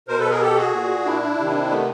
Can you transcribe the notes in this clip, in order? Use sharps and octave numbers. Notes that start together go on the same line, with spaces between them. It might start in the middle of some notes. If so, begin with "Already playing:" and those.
B2 A#4 C5
A4 B4
G#4 A#4
G4 A4
F#4 G#4
A#2
D4 E4
C3 D#3
A3 B3